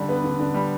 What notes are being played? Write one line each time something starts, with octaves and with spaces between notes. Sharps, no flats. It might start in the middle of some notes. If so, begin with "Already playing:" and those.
Already playing: D3 G3
B3
D3
D3
G3